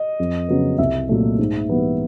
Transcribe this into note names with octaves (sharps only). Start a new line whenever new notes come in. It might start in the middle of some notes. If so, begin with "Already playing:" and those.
Already playing: D#5
F2
C#3 F#3 B3
C2 E5
A#2 F#3 A3
G#2
E3 G3 B3